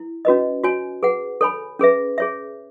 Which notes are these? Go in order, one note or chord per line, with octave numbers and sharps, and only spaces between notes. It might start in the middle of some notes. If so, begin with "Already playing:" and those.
Already playing: E4
C#4 F#4 B4 D#5
F#4 C#5 G#5
G#4 B4 F#5
A4 C#5 G#5 B5
C#4 G#4 B4 E5
G#4 C#5 E5